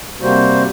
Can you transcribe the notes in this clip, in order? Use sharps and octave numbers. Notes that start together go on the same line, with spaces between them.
C3 G3 A#3 F#4 C5